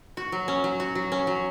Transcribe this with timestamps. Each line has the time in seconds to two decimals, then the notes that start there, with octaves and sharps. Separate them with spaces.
0.17 F#4
0.32 F#3
0.48 C#4
0.64 F#3
0.80 F#4
0.95 F#3
1.12 C#4
1.27 F#3